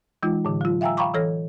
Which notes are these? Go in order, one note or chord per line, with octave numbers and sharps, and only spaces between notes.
E3 G#3 D#4 F4
A2 D3 E3
F#3 F4
E5 F5 G5 G#5 A#5 E6
F5 G5 A#5 B5 C#6 D6
E3 A4 C#5 F6 A#6